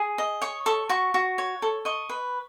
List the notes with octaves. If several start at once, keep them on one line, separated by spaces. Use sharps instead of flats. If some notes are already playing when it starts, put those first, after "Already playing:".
Already playing: G#4
D#5
C#5 C#6
A4 C#6
F#4 C#6
F#4
C#5
A4
D#5 C#6
B4